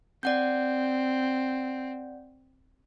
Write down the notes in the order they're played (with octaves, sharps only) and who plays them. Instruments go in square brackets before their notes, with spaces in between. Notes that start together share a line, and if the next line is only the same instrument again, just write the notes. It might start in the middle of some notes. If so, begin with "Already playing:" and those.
[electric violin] C4 [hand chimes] D5 F#5 G6